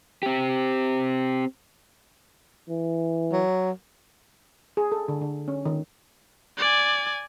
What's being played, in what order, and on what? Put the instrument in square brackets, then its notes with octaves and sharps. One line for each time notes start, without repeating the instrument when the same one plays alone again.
[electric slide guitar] C4 G4
[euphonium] E3
[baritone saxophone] F#3
[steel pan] G#4
A4
D3
D3
C#4
D#3
[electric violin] D5 G#5